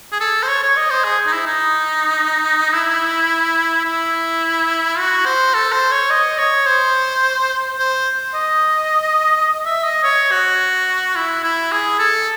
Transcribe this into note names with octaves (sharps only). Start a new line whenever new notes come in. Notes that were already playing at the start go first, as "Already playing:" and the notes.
G#4
A4
C5
C#5
C#5
D#5
C5
G#4
D#4
E4
D#4
E4
E4
F#4
C5
A4
C5
C#5
D#5
C#5
C5
C5
D#5
E5
D#5
C#5
F#4
E4
E4
G#4
A4